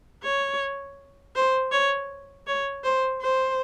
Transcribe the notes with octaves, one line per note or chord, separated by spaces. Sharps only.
C#5
C5
C#5
C#5
C5
C5